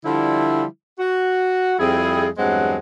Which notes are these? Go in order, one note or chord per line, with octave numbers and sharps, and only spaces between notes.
D3 F3 G3 E4
F#4
F2 G3 C4 E4 G#4
E2 G2 F#3 G#3 C4 F#5